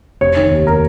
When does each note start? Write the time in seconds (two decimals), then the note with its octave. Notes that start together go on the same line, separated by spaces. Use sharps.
0.21 F1 C#5
0.37 D#3
0.51 D#2
0.67 A#4